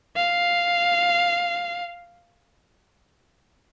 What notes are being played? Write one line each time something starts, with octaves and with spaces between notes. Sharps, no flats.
F5